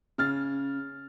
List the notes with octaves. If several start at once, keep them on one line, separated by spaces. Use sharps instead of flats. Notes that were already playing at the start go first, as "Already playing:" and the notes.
C#3 F6 A6